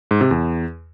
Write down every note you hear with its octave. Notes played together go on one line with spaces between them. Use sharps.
G#2
C3
E2